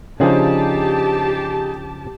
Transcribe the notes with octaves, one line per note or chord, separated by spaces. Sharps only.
C#3 F3 D4 D#4 G4 G#4 C5 A5